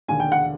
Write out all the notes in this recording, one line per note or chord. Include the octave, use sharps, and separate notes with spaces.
E1 D#2 D3 G#5
G5
F#5